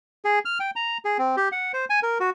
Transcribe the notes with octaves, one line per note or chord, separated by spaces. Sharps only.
G#4
F6
G5
A#5
G#4
C4
G4
F#5
C5
G#5
A#4
F#4